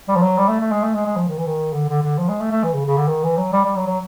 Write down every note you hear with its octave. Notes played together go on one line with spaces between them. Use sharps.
G3
F3
F#3
G3
A3
A3
G#3
A3
G#3
G#3
F3
D#3
E3
D#3
D3
D3
D3
F3
G#3
A3
A3
E3
C#3
C#3
D3
D#3
E3
F#3
G3
G3
F#3
F#3